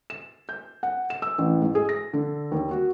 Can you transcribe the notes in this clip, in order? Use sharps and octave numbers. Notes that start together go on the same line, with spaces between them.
E7
G6
F#5
E7
E6
A1
G#2
G#4
A#6
D3
D#2
F#4